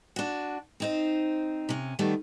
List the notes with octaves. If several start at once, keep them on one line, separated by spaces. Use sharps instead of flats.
D4 F#4
C4 D#4 C5
C3 C#4
D#3 G3 A3 B3